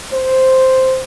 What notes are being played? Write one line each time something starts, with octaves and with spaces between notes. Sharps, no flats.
C5